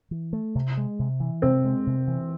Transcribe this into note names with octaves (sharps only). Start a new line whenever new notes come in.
E3
A3
C3
G#3
C3
E3
C3 C4
G#3
C3
E3